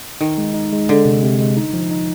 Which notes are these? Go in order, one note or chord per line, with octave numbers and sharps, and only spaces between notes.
D#3 D#4
G#3
D#4
G#3
D3 G#3
C3
C3
G#3
D#4
F3
D#4